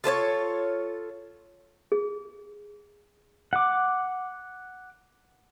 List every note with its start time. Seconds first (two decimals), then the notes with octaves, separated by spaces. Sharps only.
0.04 F4 A4 C5 C#5
1.92 G#4
3.53 F#5 D6